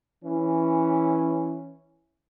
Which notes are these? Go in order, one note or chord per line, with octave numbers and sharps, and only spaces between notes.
E3 C#4